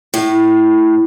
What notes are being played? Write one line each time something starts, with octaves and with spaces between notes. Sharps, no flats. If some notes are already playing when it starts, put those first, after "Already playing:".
A2